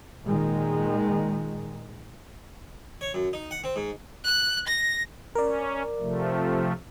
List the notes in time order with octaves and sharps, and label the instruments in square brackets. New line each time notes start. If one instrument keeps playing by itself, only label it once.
[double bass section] A#2 D#3 G#3
[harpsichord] C#5
F#2
D#4
F#5
C4
G#2
[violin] F#6
A#6
[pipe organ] C#4 [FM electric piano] A#4 D5
[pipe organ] C3 F3 A3